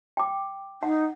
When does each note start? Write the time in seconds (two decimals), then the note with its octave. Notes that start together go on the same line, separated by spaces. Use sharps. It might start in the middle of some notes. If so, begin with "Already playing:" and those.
0.17 G5 D6
0.83 D#4 F#5